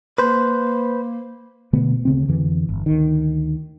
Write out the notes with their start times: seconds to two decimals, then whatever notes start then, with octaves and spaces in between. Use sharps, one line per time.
0.18 A#3 B4 C5
1.73 B2 D3 A3 B3
2.05 D2 C#3 C4
2.28 F2 D3 E3
2.69 G1
2.86 D2 D#3